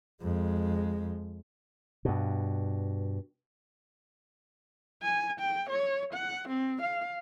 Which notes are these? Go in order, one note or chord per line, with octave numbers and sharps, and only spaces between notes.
F2 G#3
G2 B2
G#5
G5
C#5
F#5
C4
F5